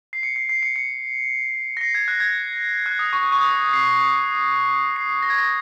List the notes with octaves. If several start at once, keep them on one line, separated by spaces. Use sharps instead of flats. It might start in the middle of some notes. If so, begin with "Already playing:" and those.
C7
C#7
C7
C7
C#7
C#7
A#6
C7
G#6
F#6
G#6
F#6
D#6
C#6
C#6
D#6
C7
C7
A#6
G#6
A#6